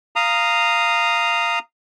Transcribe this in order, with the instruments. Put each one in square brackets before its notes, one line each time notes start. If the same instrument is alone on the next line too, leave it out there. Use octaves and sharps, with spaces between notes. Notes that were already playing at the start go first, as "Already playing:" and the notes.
[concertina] F5 A#5 D#6